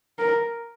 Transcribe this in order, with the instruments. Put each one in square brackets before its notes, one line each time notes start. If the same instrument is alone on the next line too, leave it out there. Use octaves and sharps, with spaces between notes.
[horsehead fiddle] A#4